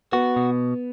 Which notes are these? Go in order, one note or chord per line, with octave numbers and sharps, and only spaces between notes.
B3 F#4
B2